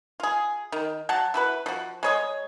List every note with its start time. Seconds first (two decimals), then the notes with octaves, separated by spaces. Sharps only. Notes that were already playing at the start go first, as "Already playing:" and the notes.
0.20 F4 G#4
0.72 D#3
1.09 F#3 F#5 A5
1.34 E4 F#4 B4
1.66 F3 F#4
2.03 G#3 C#5 D#5